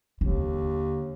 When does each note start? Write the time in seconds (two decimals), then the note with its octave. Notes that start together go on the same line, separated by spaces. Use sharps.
0.21 D#2 D3